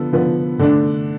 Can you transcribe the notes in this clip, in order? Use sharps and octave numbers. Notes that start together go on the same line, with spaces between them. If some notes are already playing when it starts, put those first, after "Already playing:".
Already playing: D3 F3 B3 A4
D3 F3 B3
D3 A3 D4